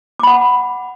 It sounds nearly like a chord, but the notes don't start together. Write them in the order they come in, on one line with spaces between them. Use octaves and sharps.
D6 B5 F#5